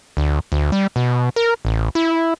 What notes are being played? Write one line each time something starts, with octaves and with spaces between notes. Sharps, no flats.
D2
D2
G3
B2
A#4
A1
E4